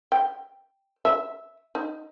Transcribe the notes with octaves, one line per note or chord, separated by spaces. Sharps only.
G5
E5
D#4